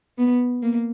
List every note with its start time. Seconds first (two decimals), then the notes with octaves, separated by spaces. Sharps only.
0.18 B3
0.62 A#3